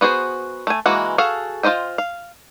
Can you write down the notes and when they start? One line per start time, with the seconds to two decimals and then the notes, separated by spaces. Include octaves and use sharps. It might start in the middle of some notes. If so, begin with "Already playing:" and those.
0.01 B3 F#4 G#4 C5
0.67 A3 G#5
0.86 E3 G#3 A#3 F#4
1.18 F#4 G#4 A4 F5
1.63 F4 F#4 C5 D#5 G5
1.98 F5